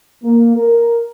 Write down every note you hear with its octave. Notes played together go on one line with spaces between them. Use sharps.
A#3
A#4